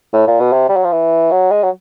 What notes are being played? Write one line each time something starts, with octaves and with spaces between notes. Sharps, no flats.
A2
A#2
B2
C3
G3
F#3
F3
E3
F#3
G#3
F#3